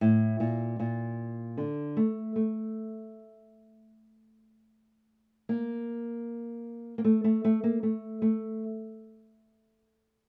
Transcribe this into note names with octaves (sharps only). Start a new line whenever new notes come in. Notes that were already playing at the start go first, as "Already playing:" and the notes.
A2
A#2
A#2
D3
A3
A3
A#3
A#3
A3
A3
A3
A#3
A3
A3